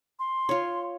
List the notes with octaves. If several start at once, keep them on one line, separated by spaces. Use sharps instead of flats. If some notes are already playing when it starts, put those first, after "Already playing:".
C6
F4 C#5